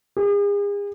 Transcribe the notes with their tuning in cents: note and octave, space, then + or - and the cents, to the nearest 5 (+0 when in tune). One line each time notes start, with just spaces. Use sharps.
G#4 -40